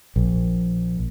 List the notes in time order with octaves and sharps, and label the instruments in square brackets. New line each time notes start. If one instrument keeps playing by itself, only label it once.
[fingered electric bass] A#1